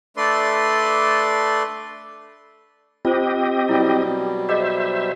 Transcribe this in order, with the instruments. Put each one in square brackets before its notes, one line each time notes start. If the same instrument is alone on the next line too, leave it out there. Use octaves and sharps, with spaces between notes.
[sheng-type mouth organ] A3 D4 A4 B4 D5 C6
[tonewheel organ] C4 G4 D#5 [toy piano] F4 C5
[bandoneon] B2 F#3 G3 [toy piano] E4
[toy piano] G#4 D#5 [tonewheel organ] C5 E5